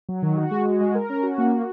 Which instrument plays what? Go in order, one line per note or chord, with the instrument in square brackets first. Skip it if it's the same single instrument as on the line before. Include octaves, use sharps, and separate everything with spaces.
[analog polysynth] F#3
D#3
F#4
G#3
F#4
G#3
A#4
C#4
F#4
A#3
F#4